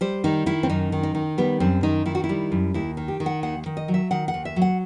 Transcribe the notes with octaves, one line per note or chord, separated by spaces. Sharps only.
G3 C5
D#3 D#4
D#3 E4
C4
F#2 D#4
D#3
D#4
D#3
G3 B3
F#2 C4
D#3 D#4
D#3 E4
F#4
E4
G3
F#2
D#2 E4
D#3
G4
D#3
F#5
D#2 F#5
D#3
D#5
F#3
E5
D#3 F#5
F#5
D#2
E5
F#3
F#5